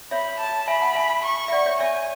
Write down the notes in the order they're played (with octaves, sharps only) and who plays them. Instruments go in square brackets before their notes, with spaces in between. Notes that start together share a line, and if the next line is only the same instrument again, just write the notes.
[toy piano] C#5 E5 [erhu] B5
[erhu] A5
[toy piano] E5 G#5 [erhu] B5
[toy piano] F#5 A5
E5 G#5
[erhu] C#6
[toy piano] E5
D5 F#5
C#5 E5
[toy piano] C#5 E5 [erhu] G#5